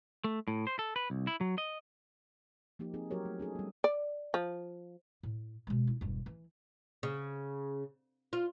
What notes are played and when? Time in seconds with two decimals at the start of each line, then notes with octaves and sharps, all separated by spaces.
0.24 A3
0.48 A2
0.67 C5
0.79 A4
0.96 B4
1.10 C2
1.27 E4
1.41 F#3
1.58 D#5
2.79 F3 A#3 D#4 G4
2.94 C4 D#4 G#4
3.11 F#3 F#4 G4 A#4 C#5
3.25 A3
3.40 C#4 D#4 G#4 A4
3.55 G3 B3
3.84 D5
4.34 F3
5.23 A2
5.67 B2 G#3
5.87 E4
6.01 E1 G2
6.26 E3
7.03 C#3
8.33 F4